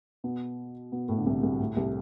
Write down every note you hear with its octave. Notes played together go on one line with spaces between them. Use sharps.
B2 B3
B2 B3
A2 A3
D3
C2 C3
C2 C3
A2
C2 C3